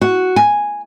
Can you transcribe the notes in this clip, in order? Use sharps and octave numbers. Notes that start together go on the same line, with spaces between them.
F#4
G#5